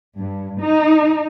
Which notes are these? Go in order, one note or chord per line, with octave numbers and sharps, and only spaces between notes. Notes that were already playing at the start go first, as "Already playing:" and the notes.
G2
D#4